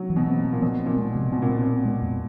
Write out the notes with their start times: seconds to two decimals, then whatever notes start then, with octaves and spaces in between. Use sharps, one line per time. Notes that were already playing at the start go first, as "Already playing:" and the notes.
Already playing: F#3
0.10 E3
0.16 B2
0.27 C3 A#3
0.45 A#3
0.53 A#2
0.62 B2 F3
0.80 C4
0.86 A#2
0.97 G#3
1.15 C3
1.32 B2 C4
1.42 A#2
1.49 C4
1.62 A#2
1.67 C4
1.85 G#3
2.02 F2